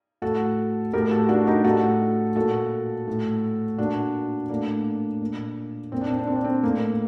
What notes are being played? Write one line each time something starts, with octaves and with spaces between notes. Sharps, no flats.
A2 F#4 A4
A2 G4 A#4
F#4 A4
D4 F#4
D#4 G4
A2 F#4 A4
A#2 F#4 A4
A2
A#2 D4 F#4
A2 A#3 D4
A#2
A#2 C4
D4
C4
D4
C4
D4
C4
A2 A#3